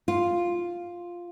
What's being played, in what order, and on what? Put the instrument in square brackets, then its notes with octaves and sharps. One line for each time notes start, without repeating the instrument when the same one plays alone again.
[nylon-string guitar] F4